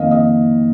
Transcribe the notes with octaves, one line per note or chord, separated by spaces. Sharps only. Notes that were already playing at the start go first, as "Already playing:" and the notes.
Already playing: F2 D#3 A#3 D#5 F5
D#5